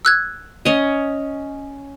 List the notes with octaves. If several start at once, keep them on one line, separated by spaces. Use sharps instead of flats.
E6 F#6 G#6
C#4 D#5